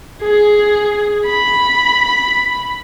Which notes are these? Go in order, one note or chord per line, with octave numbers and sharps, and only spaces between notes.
G#4
B5